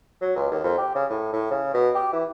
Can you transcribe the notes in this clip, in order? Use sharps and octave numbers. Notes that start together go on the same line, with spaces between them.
F#3
C#2
D#2
F2
G4
C#3
A2
A2
C#3
B2
G4
E3